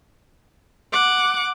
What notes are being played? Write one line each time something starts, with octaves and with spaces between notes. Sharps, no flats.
F#5 D6